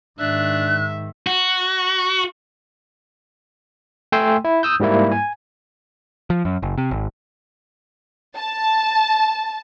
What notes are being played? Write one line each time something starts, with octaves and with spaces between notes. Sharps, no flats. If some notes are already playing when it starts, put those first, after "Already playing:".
G#2 D#3 D4 E5 F#6
F#4
A3 G5 G#5 C6 E6
E4
D#6 E6 G6
G#2 G3 A#3 E4
G#5
F3
F#2
F#1
C3
G#1
A5